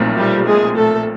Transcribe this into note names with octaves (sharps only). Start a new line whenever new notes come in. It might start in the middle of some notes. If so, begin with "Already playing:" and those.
Already playing: B1 A#2 F3 A3 C4
G3 G4
G#3 G#4
A3 A4